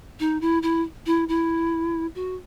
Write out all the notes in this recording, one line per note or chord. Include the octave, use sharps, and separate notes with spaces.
D#4
E4
E4
E4
E4
F#4